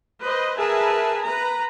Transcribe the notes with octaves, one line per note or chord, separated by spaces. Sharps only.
B4 C5 D#5
G#4 A#4 B4 E5 G#5 A5
B4 A#5